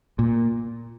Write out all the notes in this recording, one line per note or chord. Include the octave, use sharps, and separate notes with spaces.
A#2